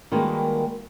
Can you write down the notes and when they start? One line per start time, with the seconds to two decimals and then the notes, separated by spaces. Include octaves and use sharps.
0.12 D#3 G3 G#3 A#3 F#4 B4